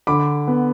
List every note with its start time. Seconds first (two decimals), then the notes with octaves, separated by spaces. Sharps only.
0.07 D3 B5 D6
0.48 B3